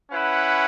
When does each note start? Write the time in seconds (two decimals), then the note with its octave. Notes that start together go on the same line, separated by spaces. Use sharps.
0.11 C#4 E4 B4 F#5